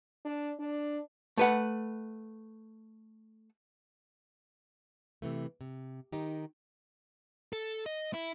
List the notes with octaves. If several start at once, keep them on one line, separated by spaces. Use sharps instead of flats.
D4
D4
A3 B4 F#5
C3 E3 A3
C3
D#3 D#4 G4
A4
D#5
E4